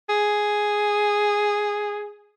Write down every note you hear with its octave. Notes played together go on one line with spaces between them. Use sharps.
G#4